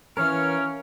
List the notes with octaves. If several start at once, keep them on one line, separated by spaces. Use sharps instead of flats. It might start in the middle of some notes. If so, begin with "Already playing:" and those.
E3 C#4 A#4 C#5 F5 F6